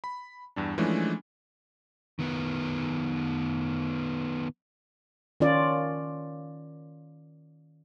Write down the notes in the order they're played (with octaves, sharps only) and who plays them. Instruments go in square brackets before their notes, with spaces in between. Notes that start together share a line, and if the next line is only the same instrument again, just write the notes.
[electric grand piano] B5
E2 G2 D4
E3 F3 G#3 A3 C#4 D4
[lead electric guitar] D#3 B3
[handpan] D#3 C#4 F4 D5